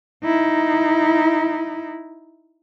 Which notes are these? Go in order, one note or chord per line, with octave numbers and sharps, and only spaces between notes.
D#4 E4